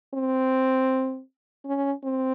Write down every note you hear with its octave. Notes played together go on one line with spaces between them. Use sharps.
C4
C#4
C4